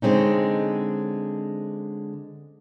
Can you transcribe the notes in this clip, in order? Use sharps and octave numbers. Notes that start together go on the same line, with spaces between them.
D3 G#3 C4 C#4 D#4